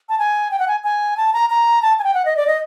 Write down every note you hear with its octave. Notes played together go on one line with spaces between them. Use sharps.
A5
G#5
G5
F#5
G#5
G#5
A5
A#5
A#5
A5
G#5
G5
F#5
D#5
D5
D#5